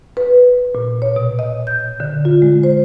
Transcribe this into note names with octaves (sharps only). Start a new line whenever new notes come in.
B4
A#2
C#5
B2
D#5
G6
D3
F4
G#3
C5